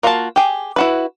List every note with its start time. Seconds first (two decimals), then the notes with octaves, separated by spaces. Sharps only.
0.03 A#3 F4 F#4 D#5 A5
0.36 G4 G#4
0.76 E4 F#4 B4